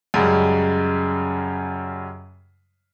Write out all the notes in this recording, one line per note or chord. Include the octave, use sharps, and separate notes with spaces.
F#2 C#3 G3 G#3